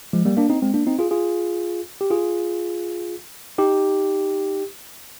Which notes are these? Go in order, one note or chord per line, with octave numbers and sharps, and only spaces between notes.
F3 G#3
G3 A#3
A#3 D4
C4 D#4
G#3 C4
A#3 D4
C4 D#4
F4 G#4
F4 G#4
G4
F4 G#4
D#4 G4